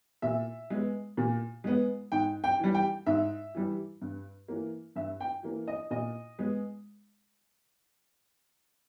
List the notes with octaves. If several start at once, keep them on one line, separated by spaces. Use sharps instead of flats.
A#2 E5
G#3 B3
A#2
G#3 B3
G#2 G5
G5
E3 G3
G5
G#2 E5
E3 G3
G2
E3 A#3
G2 E5
G5
E3 A#3
D#5
A#2 D#5
G#3 B3